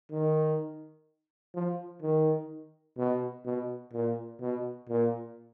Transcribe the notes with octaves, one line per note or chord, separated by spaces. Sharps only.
D#3
F3
D#3
B2
B2
A#2
B2
A#2